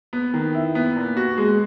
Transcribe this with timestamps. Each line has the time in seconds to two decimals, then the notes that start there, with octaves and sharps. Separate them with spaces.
0.13 B3
0.34 D#3
0.54 E4
0.75 B3
0.96 A#2
1.17 F#4
1.38 G#3